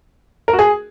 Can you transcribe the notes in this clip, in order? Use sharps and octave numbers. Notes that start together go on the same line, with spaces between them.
A#4
F#4
G#4